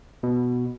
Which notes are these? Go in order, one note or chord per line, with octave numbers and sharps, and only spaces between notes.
B2